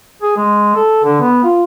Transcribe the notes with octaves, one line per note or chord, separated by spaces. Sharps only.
G#4
G#3
A4
D3
B3
F4